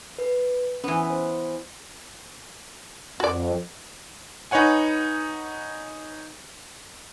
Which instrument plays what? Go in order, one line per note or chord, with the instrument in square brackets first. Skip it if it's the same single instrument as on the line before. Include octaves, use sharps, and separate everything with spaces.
[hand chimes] B4
[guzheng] E3 B3 [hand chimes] C#4
[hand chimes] C5
[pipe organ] F2 [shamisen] F#4 D5
[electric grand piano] D#4 B4 C#5 F#5 G#5